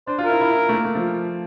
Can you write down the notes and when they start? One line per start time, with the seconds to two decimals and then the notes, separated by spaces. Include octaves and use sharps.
0.07 D4 C5
0.18 F4
0.24 A#4
0.29 E4
0.41 E4
0.51 E4
0.69 A3
0.73 A#3
0.84 A3
0.95 F3